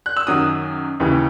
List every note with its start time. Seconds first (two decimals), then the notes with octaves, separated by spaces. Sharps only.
0.06 F#6
0.17 E6
0.27 F#2 D#3 F#3 D#6
1.00 D#2 C#3 E3